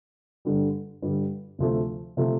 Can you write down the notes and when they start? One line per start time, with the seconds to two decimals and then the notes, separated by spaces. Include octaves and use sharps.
0.45 G2 D3 G3
1.02 G2 D3 G3
1.58 D2 C3 F3 A3
2.17 C3 F3 A3